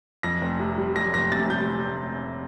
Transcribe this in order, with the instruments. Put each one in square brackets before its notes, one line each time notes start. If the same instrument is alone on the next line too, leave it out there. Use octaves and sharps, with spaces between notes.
[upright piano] F2 A#6
F1
C3
G3
F2 A#6
F1 A#6
C3 A6
G3 G6